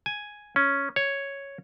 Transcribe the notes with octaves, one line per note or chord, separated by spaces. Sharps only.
G#5
C#4
C#5